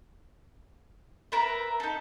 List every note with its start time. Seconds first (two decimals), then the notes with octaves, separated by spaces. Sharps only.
1.32 A#4 B4 E5
1.80 D#4 A4